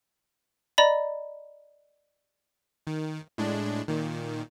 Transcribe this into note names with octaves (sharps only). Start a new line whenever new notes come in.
D5 D#5 A#5 B5
D#3
A2 G#3 D4
A#2 D#3